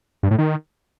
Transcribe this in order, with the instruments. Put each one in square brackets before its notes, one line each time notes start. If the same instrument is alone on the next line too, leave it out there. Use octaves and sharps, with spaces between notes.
[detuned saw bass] G2
A2
D#3